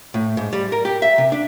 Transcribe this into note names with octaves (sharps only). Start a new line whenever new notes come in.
A2
G#2
G3
A#4
G4
E5
C3
D4